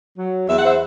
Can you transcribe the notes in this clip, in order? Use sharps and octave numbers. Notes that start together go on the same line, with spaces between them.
F#3
E2 E5
F#5
C5 E5